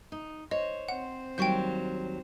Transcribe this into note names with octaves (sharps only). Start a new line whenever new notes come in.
D#4
C5 C#5 D#5
C4 C5 F#5
D#2 F#3 G3 G5 C#6 G6